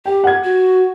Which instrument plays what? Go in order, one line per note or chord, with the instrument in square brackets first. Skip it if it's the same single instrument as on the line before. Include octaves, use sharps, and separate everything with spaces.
[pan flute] G4 [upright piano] G5
[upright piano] F#5 G#6
[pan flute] F#4